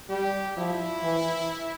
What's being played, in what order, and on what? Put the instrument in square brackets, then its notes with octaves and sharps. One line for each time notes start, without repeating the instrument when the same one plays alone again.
[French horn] G3 [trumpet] G4
[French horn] F3 [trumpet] E4
[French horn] E3